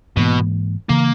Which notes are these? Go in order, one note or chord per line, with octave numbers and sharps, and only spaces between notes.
G#2 B2 E3 A#3
C#3 E3 A#3